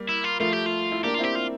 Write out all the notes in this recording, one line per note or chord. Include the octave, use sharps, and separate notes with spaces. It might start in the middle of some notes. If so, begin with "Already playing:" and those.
Already playing: G3 A#3
E4
F4
F3 A3 F4
G4
F4
E4
A#3 D4 G4
F4
C4 E4 G4
F4